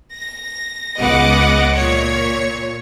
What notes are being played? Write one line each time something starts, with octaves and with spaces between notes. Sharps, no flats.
A#6
C#2 B3 D#5 F#5 D6
A#2 C#5